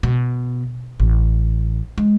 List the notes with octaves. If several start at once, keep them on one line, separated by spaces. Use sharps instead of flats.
B2
A1
G#3